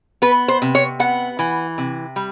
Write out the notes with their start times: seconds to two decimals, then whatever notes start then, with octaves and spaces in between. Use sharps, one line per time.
0.22 B3 B4
0.48 C5
0.62 C3
0.75 C#5
0.99 B3 F#5
1.39 E3
1.78 C3
2.16 G3